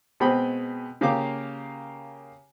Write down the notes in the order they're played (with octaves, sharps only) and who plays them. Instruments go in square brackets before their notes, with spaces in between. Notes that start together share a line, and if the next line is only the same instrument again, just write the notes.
[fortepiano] B2 G#3 C4 G5 B5 D#6
C#3 A#3 G4 F5 D6